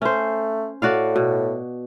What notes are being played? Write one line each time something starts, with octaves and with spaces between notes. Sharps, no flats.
A3 C#4 C5
A2 F#4 D5 F5
B2